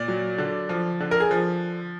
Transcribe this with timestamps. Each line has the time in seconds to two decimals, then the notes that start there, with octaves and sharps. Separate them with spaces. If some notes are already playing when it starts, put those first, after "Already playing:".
Already playing: A#2 D5
0.08 F#3
0.38 D3
0.69 F3
1.00 D3
1.11 A#4
1.20 G#4
1.31 F3